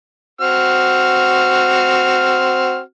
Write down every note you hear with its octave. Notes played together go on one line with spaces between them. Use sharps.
C4 F#4 F6